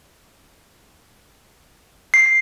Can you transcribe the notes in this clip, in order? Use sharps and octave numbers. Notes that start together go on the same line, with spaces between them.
C7